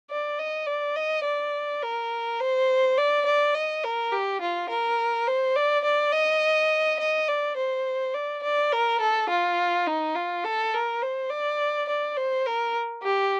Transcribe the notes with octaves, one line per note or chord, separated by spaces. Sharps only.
D5
D#5
D5
D#5
D5
A#4
C5
D5
D5
D#5
A#4
G4
F4
A#4
C5
D5
D5
D#5
D#5
D5
C5
D5
D5
A#4
A4
F4
D#4
F4
A4
A#4
C5
D5
D5
C5
A#4
G4